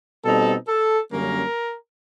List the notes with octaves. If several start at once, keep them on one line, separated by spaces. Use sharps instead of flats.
B2 G3 C4 D#4 A4
A4
F#2 D3 G3 A#3 C#4 A#4